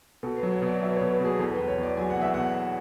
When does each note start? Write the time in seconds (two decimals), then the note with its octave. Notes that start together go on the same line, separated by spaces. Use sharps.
0.23 B2 A4
0.37 B4
0.43 F#3
0.53 C#5
0.62 B2 D5
0.81 F#3 E5
0.90 B4
0.96 B2 C#5
1.10 B4
1.20 B2 G#4
1.39 E2 A4
1.53 B4
1.59 E2
1.68 C#5
1.78 E2
1.83 D5
1.97 F#3 G#5
2.10 F#5
2.16 E2
2.22 E5
2.34 B2 F#5